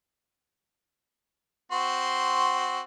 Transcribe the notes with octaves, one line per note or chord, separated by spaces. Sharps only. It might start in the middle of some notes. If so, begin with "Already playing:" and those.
C4 F#4 C6